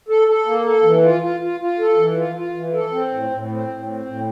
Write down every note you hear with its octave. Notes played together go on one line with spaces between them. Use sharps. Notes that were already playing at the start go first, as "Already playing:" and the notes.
A4
A4
A#3
A4
E3
F4
F4
F4
F4
A4
E3
F4
F4
E3
A4
C4
A2
A2
C4
A2
C4
A2